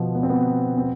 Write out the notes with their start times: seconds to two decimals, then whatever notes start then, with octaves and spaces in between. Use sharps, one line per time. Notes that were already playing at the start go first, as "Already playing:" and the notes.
Already playing: B2 F3
0.15 B3
0.23 C4
0.29 B3
0.77 C4